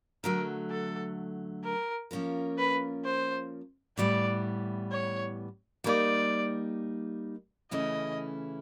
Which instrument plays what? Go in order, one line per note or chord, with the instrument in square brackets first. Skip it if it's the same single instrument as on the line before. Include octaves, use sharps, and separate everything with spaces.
[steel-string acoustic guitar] D3 F#3 A3 [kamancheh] A#4
[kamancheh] A4
A#4
[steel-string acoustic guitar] F3 A#3 C#4 F4 A#4
[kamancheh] B4
C5
[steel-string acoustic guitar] A2 E3 G3 B3 [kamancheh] D5
[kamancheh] C#5
[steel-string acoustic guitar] G3 A#3 D#4 [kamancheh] D5
[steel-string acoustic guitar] C#3 E3 A3 C#4 E4 [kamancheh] D#5